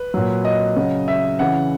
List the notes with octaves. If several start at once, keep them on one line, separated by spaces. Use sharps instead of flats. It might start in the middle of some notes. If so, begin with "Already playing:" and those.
Already playing: B4
A#2 F#3
D#5
C#3 F#3
E5
C#3 E3 F#5